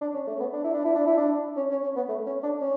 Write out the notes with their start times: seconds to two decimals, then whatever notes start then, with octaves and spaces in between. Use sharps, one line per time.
0.01 D4
0.14 C#4
0.27 A3
0.36 C#4
0.40 B3
0.53 D4
0.64 E4
0.74 D4
0.85 E4
0.96 D4
1.07 E4
1.17 D4
1.57 C#4
1.71 C#4
1.83 C#4
1.96 B3
2.09 A3
2.27 C#4
2.43 D4
2.61 C#4